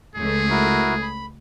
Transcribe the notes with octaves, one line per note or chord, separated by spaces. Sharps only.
C#2 A3 G#4
E4 F#4 A#4
B5